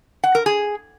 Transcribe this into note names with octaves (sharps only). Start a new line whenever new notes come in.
F#5
A#4
G#4